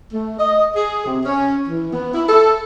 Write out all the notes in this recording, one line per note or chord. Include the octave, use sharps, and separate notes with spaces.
A3
D#5
G#4
C3
C#4
E3
B3
E4
A4